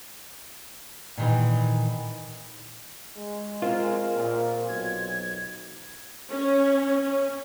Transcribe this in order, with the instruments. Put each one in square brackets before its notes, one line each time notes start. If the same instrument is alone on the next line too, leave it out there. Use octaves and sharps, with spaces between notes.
[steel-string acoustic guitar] A#2 D#3 E3
[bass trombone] G#3
[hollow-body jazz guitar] C4 F4 [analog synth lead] A#4
[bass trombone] A#2
[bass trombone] B1 [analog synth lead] G#6
[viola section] C#4
C#4